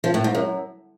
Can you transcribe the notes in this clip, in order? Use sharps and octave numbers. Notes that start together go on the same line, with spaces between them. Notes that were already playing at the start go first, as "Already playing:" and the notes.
F3
A2
G#2
F#2